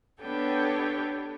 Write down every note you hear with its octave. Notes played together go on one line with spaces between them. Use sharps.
B3 D4 G4 A4 C#5 G5